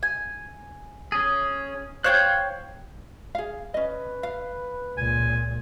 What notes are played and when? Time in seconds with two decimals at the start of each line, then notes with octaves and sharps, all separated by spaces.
0.03 G#5
1.12 C#4 G#4
2.04 C5 C#5 F5 G5 F#6
3.35 G#4 F5
3.74 C#4 B4 D#5
4.23 F5
4.97 C#2 A#2 G#5